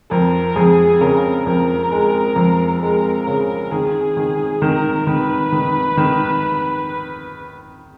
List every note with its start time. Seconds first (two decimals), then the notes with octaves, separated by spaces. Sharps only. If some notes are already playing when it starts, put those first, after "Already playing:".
0.11 F2 A#4
0.56 F2 G#4
1.01 C#3 A#4
1.46 F2 A#4
1.92 G#3
2.36 F2
2.82 G#3 A#4
3.27 C#3 A#4
3.72 D#3 G#4
4.17 D#3
4.62 D#3 A#4
5.07 D#3 B4
5.52 D#3
5.97 D#3